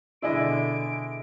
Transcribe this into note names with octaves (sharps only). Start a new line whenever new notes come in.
B2 D3 G#3 D4 E4 D#5 E5 D7